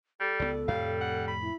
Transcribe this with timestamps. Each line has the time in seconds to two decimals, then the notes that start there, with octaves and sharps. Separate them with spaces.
0.20 G3 A4
0.40 C#2 F#3 B3 D5
0.68 F2 A2 C3 G3 F5
1.01 F#5
1.28 B5
1.42 E4